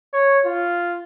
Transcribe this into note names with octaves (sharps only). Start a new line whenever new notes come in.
C#5
F4